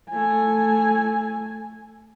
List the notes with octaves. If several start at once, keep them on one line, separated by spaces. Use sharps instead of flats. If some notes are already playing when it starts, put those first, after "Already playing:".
A3 G#5